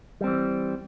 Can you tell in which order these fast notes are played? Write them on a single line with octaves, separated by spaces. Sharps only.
G3 C4 E3